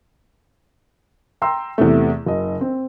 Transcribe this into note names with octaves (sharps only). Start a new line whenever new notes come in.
G5 A#5 C6 E6
E2 C3 A3
F#1 D#5
C4